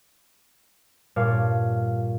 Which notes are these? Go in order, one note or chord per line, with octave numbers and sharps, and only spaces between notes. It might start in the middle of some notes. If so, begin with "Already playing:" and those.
G2 A#2 C#5 D5 F5 A5